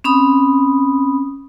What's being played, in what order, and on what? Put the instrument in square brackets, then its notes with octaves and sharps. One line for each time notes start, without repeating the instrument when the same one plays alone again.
[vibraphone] C4 C#4 B5 D#6